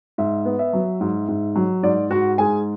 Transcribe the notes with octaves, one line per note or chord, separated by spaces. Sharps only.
G#2 E5
B3
E5
F#3
G#2
G#2
F#3
G#2 D5
G#2 F#4 F#5
G#2 G#4 G#5